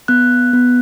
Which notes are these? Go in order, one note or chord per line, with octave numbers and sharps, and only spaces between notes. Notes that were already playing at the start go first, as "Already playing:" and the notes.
B3 F#6
B3